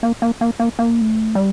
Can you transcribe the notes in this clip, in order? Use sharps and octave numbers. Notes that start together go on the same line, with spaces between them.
A#3
A#3
A#3
A#3
A#3
A3
G3